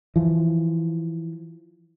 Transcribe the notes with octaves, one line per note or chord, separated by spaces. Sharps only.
E3 F3